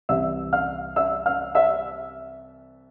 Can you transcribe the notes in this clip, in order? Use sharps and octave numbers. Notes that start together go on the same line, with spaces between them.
C2 C3 E3 G3 E5 E6
F5 F6
E5 E6
F5 F6
E5 E6